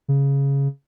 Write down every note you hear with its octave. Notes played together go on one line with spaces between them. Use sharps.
C#3